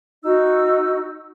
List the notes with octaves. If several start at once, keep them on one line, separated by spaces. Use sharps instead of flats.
D#4 F#4 E6